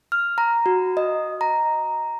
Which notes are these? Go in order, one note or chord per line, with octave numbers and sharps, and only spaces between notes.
F6
A#5
F#4
D#5
A#5